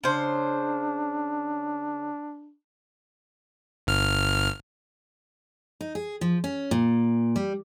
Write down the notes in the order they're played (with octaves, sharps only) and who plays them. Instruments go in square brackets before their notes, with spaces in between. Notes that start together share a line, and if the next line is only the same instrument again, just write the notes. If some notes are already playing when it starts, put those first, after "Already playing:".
[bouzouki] C#3 C5 [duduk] D4
[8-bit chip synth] G1 F6
[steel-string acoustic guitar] D#4
G#4
F3
C#4
A#2
G3